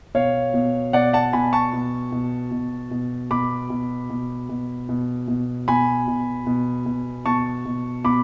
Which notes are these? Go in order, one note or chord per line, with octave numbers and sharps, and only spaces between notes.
B2 C#5 F5
B2
B2 D5 F#5
F#5 A5
B2 G#5 B5
A5 C#6
B2
B2
B2
B2
B2 B5 D6
B2
B2
B2
B2
B2
B2 G#5 B5
B2
B2
B2
B2 A5 C#6
B2
B2 B5 D6